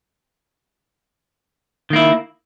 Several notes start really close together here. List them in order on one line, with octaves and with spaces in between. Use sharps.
D#3 A#3 E4